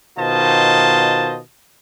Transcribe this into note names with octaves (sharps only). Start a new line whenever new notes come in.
B2 D#3 F4 C5 D#5 A5